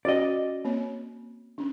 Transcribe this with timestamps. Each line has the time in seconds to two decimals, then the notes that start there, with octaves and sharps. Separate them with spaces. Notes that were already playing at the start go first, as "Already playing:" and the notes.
0.05 C#4 F#4 D5 D#5 G5
0.65 A#3 C4 C#5
1.58 C#4 D4